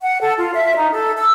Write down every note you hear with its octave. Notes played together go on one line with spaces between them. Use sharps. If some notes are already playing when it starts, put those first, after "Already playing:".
F#5
A4
F4
E5
D#4
A4
E6